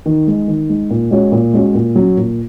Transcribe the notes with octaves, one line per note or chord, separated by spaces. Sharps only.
D#3
G#3 D#4
D#3
G#3 D#4
A#2
G#3 C#4 F#4 C#5
A#2
G#3 C#4 F#4 C#5
A#2
F#3 C#4
A#2